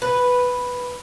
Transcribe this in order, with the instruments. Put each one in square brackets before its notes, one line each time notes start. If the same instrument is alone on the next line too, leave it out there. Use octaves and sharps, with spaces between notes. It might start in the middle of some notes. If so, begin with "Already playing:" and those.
[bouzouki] B4